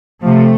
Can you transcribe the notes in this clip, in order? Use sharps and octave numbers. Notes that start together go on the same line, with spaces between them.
C3 F3 A3